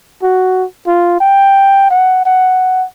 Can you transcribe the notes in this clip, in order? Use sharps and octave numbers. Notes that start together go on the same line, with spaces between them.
F#4
F4
G5
F#5
F#5